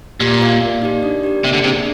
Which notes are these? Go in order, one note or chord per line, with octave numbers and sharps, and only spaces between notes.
A#2 G4
A#4 D5 F5
A#3
D#4 G4 D5
D4
G4 A#4 D5
C3 A#3
D3
C3 D4 G#4 D5